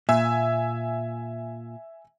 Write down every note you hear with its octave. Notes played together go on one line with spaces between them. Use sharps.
A#2 E5 G#5 E6